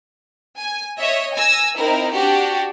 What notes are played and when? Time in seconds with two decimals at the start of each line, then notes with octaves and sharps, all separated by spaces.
0.58 G#5
0.98 C#5 D#5 E5
1.34 G#5 E6 A#6
1.77 C4 D#4 E4 A#4
2.13 D4 F#4 G4